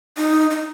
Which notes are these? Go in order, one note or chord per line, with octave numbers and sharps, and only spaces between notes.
D#4
D#4